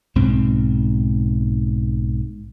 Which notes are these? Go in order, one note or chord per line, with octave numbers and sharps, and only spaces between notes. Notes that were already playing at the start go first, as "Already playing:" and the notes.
B1 G#2 C4